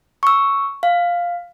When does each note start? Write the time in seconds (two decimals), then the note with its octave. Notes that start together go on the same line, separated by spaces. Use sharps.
0.23 C#6 E6
0.83 F5